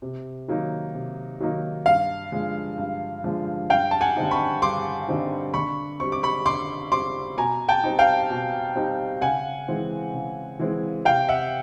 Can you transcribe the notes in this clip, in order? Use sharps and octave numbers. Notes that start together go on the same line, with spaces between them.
C3
D#3 F#3 A#3 D#4
C3
D#3 F#3 A#3 D#4
G2 F5
D3 F3 G#3
G2
D3 F3 G#3
G2 F5 G5
A5
F#5 G#5
D3 G3 C4 D#4
B5 C#6
G2 C6 D6
D3 G3 C4 D#4
D3 B5 C#6
G3 C4 C#6
D6
B5 C#6
D3 C6 D6
G3 C4 C6 D6
B2 G#5 A#5
G5 A5
G3 C4 D#4
F5 G5
B2
G3 C4 D#4
C#3 F#5 G#5
E3 G#3 C4
C#3
E3 G#3 C4
C3 F5 G5
E5 F#5